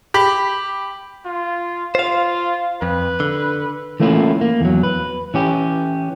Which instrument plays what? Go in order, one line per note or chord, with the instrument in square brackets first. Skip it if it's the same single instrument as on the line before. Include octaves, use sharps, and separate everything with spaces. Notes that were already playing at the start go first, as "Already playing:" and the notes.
[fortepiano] G4 B5
[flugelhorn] F4
[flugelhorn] F4 [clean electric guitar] C5 F5
[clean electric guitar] F2 [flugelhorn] B4
[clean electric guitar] D3
E3 A3 A#3 C#4 E4 F4
A#3
E2 F#3
B4
E3 C#4 G4